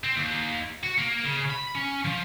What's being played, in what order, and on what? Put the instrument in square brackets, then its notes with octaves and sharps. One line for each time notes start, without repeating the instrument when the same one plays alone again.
[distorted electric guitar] C4
D#2
F#4
A#3
C#3
B5
C#4
F3